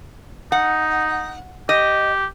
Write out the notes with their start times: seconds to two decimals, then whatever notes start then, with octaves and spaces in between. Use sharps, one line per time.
0.52 D#4 F#5
1.69 G4 D#5